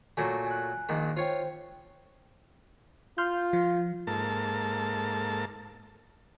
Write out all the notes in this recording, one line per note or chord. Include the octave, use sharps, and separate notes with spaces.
A#2 F#3 A3 G#5
G#5 F#6
A#1 A#2 D#3
F4 C5 C#5 G5
F4 C6 F6 G6
F3
G#2 A#3 A4 A5